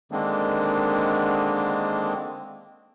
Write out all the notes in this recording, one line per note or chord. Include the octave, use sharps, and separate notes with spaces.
D3 D#3 G#3 A#3 C4 D4